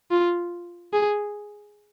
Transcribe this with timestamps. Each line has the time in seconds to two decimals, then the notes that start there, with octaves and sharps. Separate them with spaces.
0.11 F4
0.93 G#4